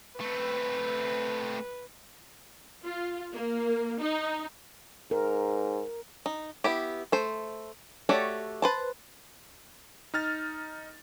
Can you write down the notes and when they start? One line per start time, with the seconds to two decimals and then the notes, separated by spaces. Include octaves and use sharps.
0.20 A3 C4 B4
2.85 F4
3.33 A#3
4.01 D#4
5.11 G#2 A#4
6.26 D#4
6.64 B3 E4 G4
7.12 A3 C5
8.09 A3 F#4 G4 C#5 D5
8.62 B4 C5 A5
10.14 D#4 F6 A6